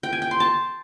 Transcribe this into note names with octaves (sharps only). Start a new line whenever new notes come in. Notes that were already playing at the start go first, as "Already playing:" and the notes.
G5
G#5
G5
C6
A5